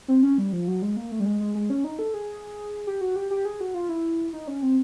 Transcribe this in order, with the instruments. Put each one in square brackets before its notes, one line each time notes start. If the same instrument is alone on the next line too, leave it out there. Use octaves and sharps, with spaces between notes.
[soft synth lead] C4
C#4
G3
F3
F#3
G#3
A#3
A3
G3
G#3
G#3
G#3
C#4
D#4
A4
G#4
G4
F#4
G4
G4
G#4
F#4
F4
E4
D#4
C#4
C4